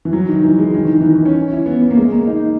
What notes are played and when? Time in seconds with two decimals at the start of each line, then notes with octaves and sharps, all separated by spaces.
0.05 E3
0.13 F#3
0.28 D#3
0.43 E3
0.58 G#3
0.74 D#3
0.85 E3
0.94 D#3
1.01 E3
1.05 D#3
1.15 D#3
1.25 C#4
1.36 C#4
1.52 E4
1.66 B3
1.81 B3
1.91 A#3
1.97 G#3
2.12 A#3
2.27 D#4